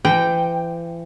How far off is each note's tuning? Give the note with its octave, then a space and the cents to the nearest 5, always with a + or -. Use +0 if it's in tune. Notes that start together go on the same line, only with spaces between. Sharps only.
E3 +40 G5 +0